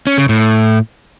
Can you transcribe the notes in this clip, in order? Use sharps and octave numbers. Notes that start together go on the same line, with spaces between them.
C#4
C#3
A2